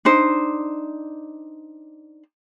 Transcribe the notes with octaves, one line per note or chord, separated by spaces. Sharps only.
D4 D#4 C5